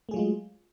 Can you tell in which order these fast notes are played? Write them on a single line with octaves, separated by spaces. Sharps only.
A3 G#4 F#3 F4 G#3